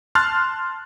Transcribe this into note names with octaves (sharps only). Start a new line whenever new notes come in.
A5 C6 F6 F#6 A6